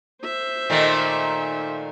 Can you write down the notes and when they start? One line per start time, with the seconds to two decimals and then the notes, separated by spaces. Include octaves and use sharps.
0.24 C5 E5
0.70 A#2 D#3 A3